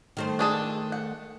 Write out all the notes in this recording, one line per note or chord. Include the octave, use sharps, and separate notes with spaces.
D#3 A3 C5
D4 G#4 A4
F#5